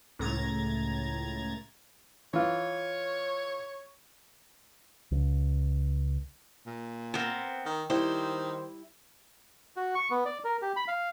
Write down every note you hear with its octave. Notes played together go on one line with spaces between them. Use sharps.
C#2 A2 A#5 G#6 A6
E3 F4 C#5
C#2
A#2
B3 C4 A#4 E5
D#3
D#3 G3 E4 C5
F#4
C#6
B3
D5
A#4
G4
B5
F5